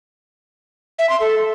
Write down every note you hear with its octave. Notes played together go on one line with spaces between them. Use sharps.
E5
C6
A4